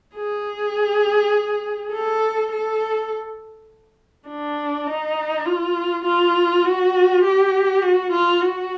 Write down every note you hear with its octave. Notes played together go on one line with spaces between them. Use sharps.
G#4
A4
A4
D4
D#4
F4
F4
F#4
G4
F#4
F4
F#4